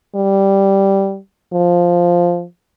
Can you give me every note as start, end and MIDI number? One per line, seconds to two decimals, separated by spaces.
0.16 1.18 55
1.53 2.44 53